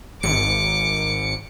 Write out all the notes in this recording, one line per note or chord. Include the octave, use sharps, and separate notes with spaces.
G#1 D6 C#7